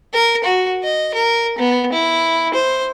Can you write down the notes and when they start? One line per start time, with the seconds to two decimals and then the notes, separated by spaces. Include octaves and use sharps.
0.13 A#4
0.44 F#4
0.84 D#5
1.14 A#4
1.58 B3
1.92 E4
2.54 C5